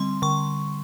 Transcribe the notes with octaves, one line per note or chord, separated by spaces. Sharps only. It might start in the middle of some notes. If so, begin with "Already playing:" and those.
Already playing: D3 G3 C4 C6
D3 C#6